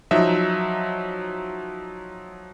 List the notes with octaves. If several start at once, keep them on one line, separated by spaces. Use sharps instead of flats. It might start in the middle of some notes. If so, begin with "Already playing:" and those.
F3 F#3 D#4 E5